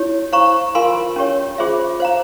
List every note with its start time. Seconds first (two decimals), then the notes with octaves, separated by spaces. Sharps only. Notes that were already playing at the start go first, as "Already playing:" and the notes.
Already playing: E4 G4 C#5
0.33 C5 F5 A#5 C#6
0.75 F4 A#4 F5 G#5 C6
1.16 C#4 G4 C#5
1.58 F4 G#4 C5 E5
2.00 C5 F5 A#5